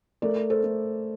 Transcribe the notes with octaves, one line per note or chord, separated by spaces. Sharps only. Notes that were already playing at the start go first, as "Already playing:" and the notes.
A3 A#4 D5
A4 C5
A3